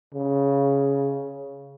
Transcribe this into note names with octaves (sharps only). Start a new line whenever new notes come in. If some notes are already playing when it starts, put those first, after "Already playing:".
C#3